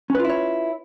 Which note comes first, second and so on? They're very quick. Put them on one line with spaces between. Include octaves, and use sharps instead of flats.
C#4 B4 F4 E4 C#5